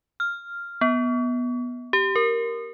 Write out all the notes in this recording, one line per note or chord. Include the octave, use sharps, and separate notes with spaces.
F6
B3
G4
A#4